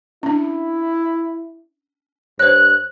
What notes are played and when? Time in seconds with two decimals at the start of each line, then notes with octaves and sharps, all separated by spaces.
0.23 C#4 D4 E4
2.39 G2 C5 C#5 F#6